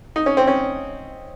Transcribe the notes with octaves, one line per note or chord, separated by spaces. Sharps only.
D#4
C#4
C4
C#4